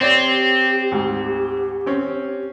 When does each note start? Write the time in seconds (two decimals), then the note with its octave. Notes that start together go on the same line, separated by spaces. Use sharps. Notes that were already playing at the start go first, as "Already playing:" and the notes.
0.01 C4 G4 C#5 D5
0.92 D2 G#2
1.86 C4 C#4